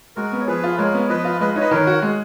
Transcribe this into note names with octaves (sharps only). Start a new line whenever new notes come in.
G#3 F#4 A#4
B3
C#5
F3 G#4 B4
F4
G#3 A#4 C#5
B3
F3 B4 D#5
F4
G#3 B4 D#5
D#4 C#5
B4 D#5
D#3 A#4 C#5
F#4
G#3